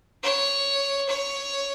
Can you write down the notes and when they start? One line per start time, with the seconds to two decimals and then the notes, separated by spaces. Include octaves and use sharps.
0.23 C#5
1.09 C#5